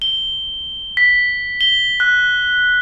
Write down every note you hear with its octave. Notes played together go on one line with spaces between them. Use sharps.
G7
B6
G7
F#6